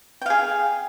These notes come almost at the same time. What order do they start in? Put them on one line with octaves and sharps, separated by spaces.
G5 F5 G#4